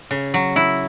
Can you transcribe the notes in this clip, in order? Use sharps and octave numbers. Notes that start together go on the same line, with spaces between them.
C#3
F#3
E4